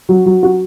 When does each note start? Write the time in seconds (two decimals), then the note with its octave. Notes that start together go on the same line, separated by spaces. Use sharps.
0.09 F#3
0.26 F#3
0.43 F#4